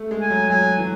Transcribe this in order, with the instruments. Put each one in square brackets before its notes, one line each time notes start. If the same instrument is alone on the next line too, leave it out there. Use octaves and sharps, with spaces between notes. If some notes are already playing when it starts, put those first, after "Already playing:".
Already playing: [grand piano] A3
G#3
[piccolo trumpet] G#5
[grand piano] F#3
[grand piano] F#3 [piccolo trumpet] G#5
[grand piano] E3